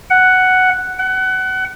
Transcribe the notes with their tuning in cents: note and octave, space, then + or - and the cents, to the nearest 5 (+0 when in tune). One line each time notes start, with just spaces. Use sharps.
F#5 +5
F#5 +25